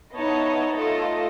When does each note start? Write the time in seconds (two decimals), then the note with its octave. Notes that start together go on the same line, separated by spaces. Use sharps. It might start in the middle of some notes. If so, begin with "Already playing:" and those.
0.15 B3 D#4 E4 C#5 D#5 A5
0.78 A3 F4 A4 D#5